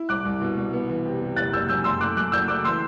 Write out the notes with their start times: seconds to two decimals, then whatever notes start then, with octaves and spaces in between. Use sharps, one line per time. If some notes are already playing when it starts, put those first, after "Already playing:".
Already playing: E4
0.09 C2 D6 F#6
0.25 C2
0.41 B2
0.57 C2
0.73 B3
0.89 E3
1.05 C3
1.20 C3
1.36 F#1 F#6 A6
1.53 F#1 E6 G6
1.68 F#2 E6 G6
1.84 F#2 C6 E6
2.01 A3 D6 F#6
2.17 F#2 D6 F#6
2.32 F#1 E6 G6
2.48 A3 D6 F#6
2.64 E3 C6 E6